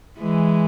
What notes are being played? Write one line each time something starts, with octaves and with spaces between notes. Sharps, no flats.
E3 G#3